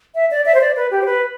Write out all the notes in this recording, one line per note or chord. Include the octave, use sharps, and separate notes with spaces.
E5
D5
E5
C5
D5
B4
G4
C5
B4